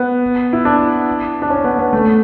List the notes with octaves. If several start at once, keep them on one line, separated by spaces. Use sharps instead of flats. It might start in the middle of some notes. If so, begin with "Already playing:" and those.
Already playing: B3
E4
D4
D4
C#4
B3
B3
A3